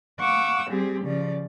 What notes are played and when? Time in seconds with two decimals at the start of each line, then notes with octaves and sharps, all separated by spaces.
0.19 F5 F#5 C#6 D6 E6
0.70 G3 C4 G4 G#4
1.06 C#3 F3 D5